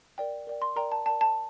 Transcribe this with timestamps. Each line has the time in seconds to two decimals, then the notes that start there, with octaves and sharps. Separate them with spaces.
0.18 A#4 D5 G5
0.47 A#4 D5 G5
0.62 C6
0.76 A#4 D5 G5 A#5
0.92 A5
1.06 A#4 D5 G5 A5
1.21 A5